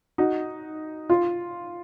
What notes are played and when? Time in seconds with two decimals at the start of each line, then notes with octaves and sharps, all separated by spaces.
0.18 D#4 F#4
1.09 F4